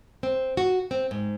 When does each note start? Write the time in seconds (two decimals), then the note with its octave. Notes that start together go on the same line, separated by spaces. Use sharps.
0.23 C4
0.57 F#4
0.91 C4
1.11 G#2